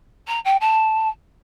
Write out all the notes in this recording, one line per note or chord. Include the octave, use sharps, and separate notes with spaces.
A#5
G5
A5